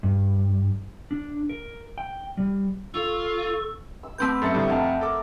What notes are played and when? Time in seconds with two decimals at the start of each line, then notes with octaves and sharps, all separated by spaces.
0.03 G2
1.11 D4
1.49 A#4
1.98 G5
2.37 G3
2.94 F4 A4 C#6
4.03 E6
4.18 A3 B3 C4 D6 G6
4.42 F#2 A4 E5 D#6 A6 C#7
4.54 A2 D3 G3
4.69 F2 F5 F#5 A5 A#5
5.01 A4 A#4 D6